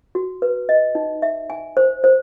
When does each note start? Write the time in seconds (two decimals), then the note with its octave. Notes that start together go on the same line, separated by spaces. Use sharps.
0.15 F#4
0.42 B4
0.69 D#5
0.95 D#4
1.22 E5
1.50 G#5
1.77 C5
2.04 C5